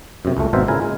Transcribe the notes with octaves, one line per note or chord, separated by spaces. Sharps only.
F#2 C3
C#2 A3
G#1 B2 A#4 C5 E5
A#2 C#3 E4 A#4 G#5
G#3